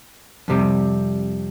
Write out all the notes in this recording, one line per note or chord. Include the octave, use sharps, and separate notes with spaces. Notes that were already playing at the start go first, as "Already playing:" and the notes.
F2 C3 G3